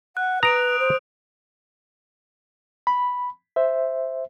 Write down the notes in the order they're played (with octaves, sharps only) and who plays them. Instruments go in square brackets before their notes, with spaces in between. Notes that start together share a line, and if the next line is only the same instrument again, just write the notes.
[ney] F#5 [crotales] F#6
[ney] B4 [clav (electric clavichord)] A#5 [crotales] D#6 D7 F7
[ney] C5
[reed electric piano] B5
C5 E5